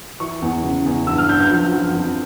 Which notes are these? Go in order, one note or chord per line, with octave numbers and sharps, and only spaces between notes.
E3 C#6
E2
C#3
E2
G2 E6
F6
G2 G6
G6
F3
F3
F2